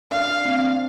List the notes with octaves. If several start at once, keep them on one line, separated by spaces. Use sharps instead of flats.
D4 F5
C4